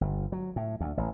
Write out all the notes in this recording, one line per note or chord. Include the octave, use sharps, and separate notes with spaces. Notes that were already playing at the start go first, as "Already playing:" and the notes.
G1
F#3
A2
D2
A1